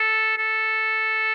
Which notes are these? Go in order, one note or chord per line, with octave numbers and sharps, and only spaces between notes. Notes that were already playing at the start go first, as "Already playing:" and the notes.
Already playing: A4
A4